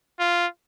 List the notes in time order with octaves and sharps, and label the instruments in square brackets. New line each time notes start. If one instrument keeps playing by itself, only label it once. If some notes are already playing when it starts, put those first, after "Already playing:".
[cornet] F4